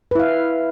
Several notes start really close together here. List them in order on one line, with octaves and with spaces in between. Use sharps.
B4 E4 F5